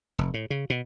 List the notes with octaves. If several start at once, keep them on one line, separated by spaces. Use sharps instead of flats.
F1
A2
C#3
B2